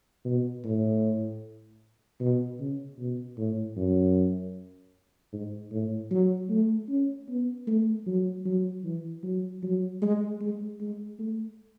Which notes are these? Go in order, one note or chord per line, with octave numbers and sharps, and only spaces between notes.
B2
A2
B2
C#3
B2
A2
F#2
G#2
A2
F#3
A3
C#4
B3
A3
F#3
F#3
E3
F#3
F#3
G#3
G#3
G#3
A3